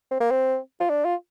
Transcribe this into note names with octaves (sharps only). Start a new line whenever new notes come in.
C4
A#3
C4
F4
D4
F4